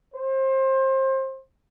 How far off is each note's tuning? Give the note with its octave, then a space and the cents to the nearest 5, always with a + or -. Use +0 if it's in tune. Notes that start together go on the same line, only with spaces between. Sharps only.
C5 +25